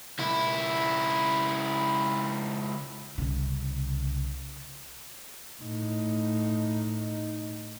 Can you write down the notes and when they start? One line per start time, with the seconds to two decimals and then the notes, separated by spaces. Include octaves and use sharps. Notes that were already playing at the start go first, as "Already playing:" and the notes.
0.20 C#2 E4
3.18 C2 C#3
5.62 A2 D#4